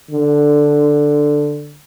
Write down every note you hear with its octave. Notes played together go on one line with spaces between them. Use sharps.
D3